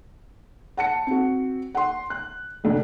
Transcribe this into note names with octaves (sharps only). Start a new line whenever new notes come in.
F#5 A5 C#7
C4 F#4
F#5 C6
F#6
F1 D2 D4